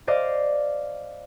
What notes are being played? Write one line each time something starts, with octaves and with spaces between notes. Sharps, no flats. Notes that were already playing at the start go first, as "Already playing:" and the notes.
C5 D5 D#5 F5 D6